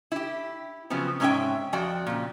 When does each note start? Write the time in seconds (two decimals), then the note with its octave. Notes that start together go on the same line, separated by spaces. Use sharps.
0.12 E4 G4
0.90 C#3 F3 F#3 B3 C4
1.20 G#2 C3 C#4 D#4 E5 G5
1.73 F2 F3 F#4 D5 G5
2.07 A#2 C#3